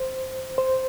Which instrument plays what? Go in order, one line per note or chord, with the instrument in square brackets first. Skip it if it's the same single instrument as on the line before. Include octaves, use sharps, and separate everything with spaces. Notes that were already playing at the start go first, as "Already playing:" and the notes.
Already playing: [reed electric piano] C5
C5